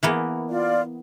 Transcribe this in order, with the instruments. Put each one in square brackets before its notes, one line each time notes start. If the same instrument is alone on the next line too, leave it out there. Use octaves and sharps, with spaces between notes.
[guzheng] E3 A#3 B3
[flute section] F4 D5